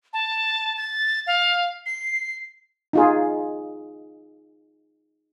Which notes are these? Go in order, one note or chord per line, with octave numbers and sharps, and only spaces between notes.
A5
A6
F5
C7
D#4 F4 G#4